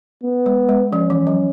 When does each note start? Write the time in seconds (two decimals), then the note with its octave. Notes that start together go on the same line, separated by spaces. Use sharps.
0.23 B3
0.46 G#3
0.69 G#3
0.93 F3 C#4
1.10 E3
1.27 F#3